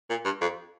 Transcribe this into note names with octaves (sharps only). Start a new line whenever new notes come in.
A#2
G2
F2